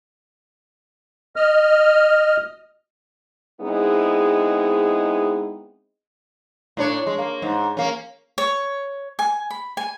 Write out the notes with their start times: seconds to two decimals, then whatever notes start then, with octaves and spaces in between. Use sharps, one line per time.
1.36 D#5 F6
3.60 G#3 B3 C4 D#4 E4 G#4
6.77 A2 D4 C#5
7.07 G#3
7.18 A#3
7.42 G#2
7.77 A#3 C#4
8.38 C#5
9.19 G#5
9.51 B5
9.77 G#5